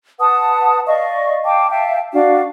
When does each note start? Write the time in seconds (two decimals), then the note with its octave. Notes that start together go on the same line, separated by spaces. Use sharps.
0.19 B4 F#5 A5 D#6
0.86 D5 D#5 F5 C#6
1.44 F5 G5 A5 D6
1.69 E5 F5 G5 A5
2.12 D4 F#4 F5